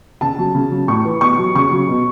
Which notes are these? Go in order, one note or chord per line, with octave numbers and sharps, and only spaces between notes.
C#3 A5
F#3
C#3
F#3
A2 C#6
E3
B2 C#6
F#3
C#3 C#6
F#3
B2